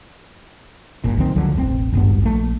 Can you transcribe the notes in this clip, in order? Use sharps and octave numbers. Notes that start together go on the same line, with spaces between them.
F#1 A#2
B1 D#3 C4
C#2 D3 F3 F#3
E1 A1 G#2 C4
D#1 G#1 G2 B3
A#1 A3